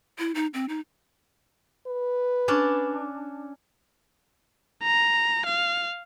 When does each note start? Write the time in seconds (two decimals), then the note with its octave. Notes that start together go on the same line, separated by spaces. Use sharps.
0.19 E4
0.35 D#4
0.54 C4
0.69 D#4
1.87 B4
2.48 C#4 D4 D5
4.83 A#5
5.46 F5